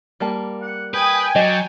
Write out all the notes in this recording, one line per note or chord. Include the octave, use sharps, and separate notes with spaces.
G3 A#3 A5
F#5
B4 G5 G#5 D#6
F#3 D5 D#5